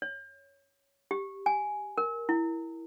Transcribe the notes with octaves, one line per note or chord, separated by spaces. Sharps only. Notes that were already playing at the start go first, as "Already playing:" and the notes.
C#5
G4
G#5
A#4
E4